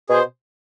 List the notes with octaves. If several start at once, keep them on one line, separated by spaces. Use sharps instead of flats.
B2 G#4 C5